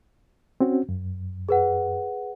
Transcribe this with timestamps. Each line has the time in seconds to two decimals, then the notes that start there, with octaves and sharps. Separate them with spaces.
0.60 C4 C#4 F#4
0.89 F#2
1.49 G#4 B4 F#5